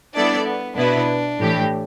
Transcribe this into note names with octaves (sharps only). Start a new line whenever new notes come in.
G3 B3 D4 E4 A4 D5
B3
B2 B3 D4 E4 B4
A2 E3 A3 G4